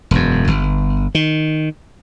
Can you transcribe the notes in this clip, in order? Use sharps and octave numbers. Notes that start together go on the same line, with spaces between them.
E1 F#2
G1
D#3